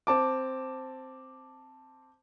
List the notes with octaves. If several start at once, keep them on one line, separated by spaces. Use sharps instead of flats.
C4 A5 D6